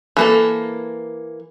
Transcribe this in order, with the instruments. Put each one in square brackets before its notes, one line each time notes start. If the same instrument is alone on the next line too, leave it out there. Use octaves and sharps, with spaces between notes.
[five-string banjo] E3 A#3 A4